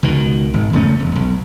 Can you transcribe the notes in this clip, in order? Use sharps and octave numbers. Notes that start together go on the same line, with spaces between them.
C#2 B2 D#3
G#1
E1 C#3 A3 C#4
E1
B1